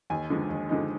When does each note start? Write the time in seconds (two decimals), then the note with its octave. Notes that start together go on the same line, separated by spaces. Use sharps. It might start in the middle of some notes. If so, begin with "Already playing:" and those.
0.10 D#2 G#5
0.30 D3 F3 G#3 D#4
0.49 D#2
0.69 D3 F3 G#3 D#4